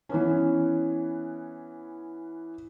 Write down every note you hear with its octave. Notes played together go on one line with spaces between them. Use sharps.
E3 B3 C#4